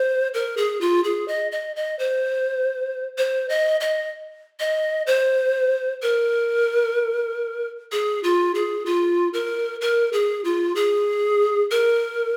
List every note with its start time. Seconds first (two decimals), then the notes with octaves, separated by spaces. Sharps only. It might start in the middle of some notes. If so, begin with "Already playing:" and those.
Already playing: C5
0.34 A#4
0.57 G#4
0.81 F4
1.04 G#4
1.28 D#5
1.52 D#5
1.76 D#5
1.99 C5
3.18 C5
3.49 D#5
3.81 D#5
4.60 D#5
5.07 C5
6.02 A#4
7.92 G#4
8.24 F4
8.55 G#4
8.86 F4
9.34 A#4
9.81 A#4
10.13 G#4
10.44 F4
10.76 G#4
11.71 A#4